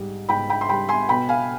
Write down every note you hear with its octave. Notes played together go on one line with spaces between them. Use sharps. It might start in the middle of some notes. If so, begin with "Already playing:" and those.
Already playing: G#2 G3
G#2 G5 B5
G5 B5
C6
G3 G5 B5
G#5 C6
B2 G5 B5
F5 G#5